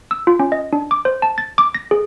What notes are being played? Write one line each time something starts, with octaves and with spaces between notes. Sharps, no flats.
E6
F4
C#4
D#5
D4
D6
C5
A5
A6
D6
A#6
G#4